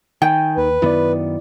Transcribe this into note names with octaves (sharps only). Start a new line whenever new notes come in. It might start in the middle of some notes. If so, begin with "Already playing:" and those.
D#3 G5 G#5 G6
D#2 B4
F#2 D#3 B3 E4 D5